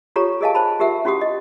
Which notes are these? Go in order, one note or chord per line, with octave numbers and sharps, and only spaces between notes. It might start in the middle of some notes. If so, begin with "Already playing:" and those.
F4 G4 A4 C#5 A#5 C#6
G#4 A#4 D#5 F5 G#5 A5
C5 A5 B5
F4 G4 A#4 E5 F#5
C#4 E4 F#4 G4 F#5 D#6
D#5